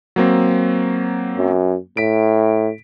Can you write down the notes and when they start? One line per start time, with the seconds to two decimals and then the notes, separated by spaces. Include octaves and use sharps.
0.16 F#3 A#3 C4
1.38 F#2
1.97 A2 B6 D7